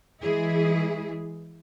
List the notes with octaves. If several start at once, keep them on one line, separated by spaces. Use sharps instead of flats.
E3 G#3 E4 G#4